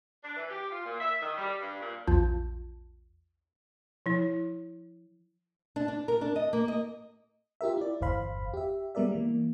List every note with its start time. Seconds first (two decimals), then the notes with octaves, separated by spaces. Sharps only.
0.24 D4
0.36 E3
0.49 G4
0.71 F4
0.85 A#2
0.99 E5
1.22 D#3
1.37 G3
1.60 G2
1.80 A#2
2.07 A#1 E2 F3 F4 A5 G6
4.06 F3 E4
5.76 D4
5.88 D4
6.08 A#4
6.21 D4
6.36 D#5
6.53 A#3
6.68 D#5
7.61 F4 G4 A#4 E5
7.77 E4 D5
8.01 G1 E2 C5 F5 B5
8.54 G4 E5
8.95 G3 G#3 B3 A#4 D5 E5
9.12 E3 A#3